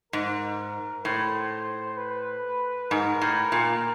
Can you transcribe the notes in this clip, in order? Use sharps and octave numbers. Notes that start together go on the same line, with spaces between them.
G#2 A#4
A2 C5
B4
G#2 A#4
A2
A#2